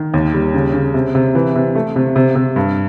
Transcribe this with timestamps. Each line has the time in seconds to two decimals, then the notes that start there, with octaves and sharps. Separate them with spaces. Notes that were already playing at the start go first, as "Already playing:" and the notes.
Already playing: D#3
0.14 D#2
0.34 G3
0.54 C#3
0.74 C#3
0.94 C3
1.15 C3
1.35 E3
1.55 C3
1.75 A3
1.96 C3
2.16 C3
2.35 C3
2.56 G2